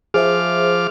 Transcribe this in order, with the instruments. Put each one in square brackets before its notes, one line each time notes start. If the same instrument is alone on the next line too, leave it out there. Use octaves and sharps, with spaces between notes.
[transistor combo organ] F3 D6 F6 [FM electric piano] G#4 C5 E5